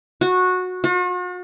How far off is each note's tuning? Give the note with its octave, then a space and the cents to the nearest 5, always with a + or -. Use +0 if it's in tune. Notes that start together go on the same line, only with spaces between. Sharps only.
F#4 -15
F#4 -45